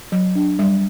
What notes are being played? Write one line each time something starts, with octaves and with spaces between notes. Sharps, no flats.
F#3
D4
G3